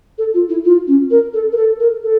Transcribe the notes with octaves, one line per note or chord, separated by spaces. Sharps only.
A4
F4
E4
F4
C#4
A#4
A4
A#4
A4
A#4
A4